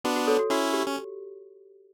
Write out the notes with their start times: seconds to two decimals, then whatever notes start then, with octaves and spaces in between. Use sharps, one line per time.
0.04 B3 D4 F#4
0.16 F#4
0.27 A4 C#5
0.39 F#4
0.50 C#4 E4 F#4
0.73 G4
0.87 C#4